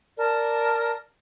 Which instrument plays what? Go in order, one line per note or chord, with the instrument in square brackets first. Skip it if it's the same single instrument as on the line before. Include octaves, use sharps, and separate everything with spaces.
[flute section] A#4 D5 A5